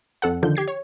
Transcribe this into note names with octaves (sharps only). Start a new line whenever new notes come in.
F2 A4 F#5
D3 D#3 F3 G6
G4 G#6 C7
C#5